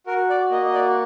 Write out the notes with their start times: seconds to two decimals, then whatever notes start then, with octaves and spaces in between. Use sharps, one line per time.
0.07 F#4 A#4
0.30 D5
0.51 A#3 D#5
0.65 D#5
0.74 D5